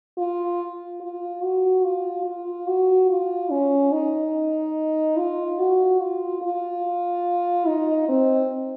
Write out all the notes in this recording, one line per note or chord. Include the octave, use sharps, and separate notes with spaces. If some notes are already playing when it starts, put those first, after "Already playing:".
F4
F4
F#4
F4
F4
F#4
F4
C#4
D#4
F4
F#4
F4
F4
D#4
C4